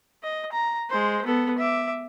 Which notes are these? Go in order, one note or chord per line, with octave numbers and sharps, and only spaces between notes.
D#5
A#5
G#3 C5
B3 A4
E5 D6